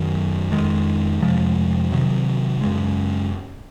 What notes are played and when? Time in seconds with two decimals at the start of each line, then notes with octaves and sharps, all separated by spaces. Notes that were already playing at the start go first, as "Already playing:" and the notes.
Already playing: F#2 D#3 F#3
0.52 F2 D#3 G#3
1.21 F2 C3 F3 G#3
1.91 C3 D#3 F#3
2.61 F#2 C#3 G#3